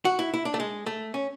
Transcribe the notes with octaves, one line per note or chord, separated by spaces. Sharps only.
F#4
E4
E4
D4
A3
G#3
A3
C#4